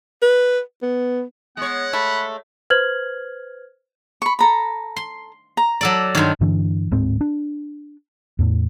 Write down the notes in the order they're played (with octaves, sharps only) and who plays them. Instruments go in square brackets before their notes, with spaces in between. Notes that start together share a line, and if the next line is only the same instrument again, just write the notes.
[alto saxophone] B4
B3
[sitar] G#3 C#5 [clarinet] B3 [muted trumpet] F#5
[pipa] A3 [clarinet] B5
[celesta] B4 C5 F6 G#6 F#7
[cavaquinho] B5 C#6
A4 A#5 B5
[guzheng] C6
[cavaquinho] A#5
[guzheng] F#3 A4 D5
[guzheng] G2 D#3 [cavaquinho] C#5 C6
[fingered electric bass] G2 D3 E3 D4
D1 G#2 C4
D4
E2 A2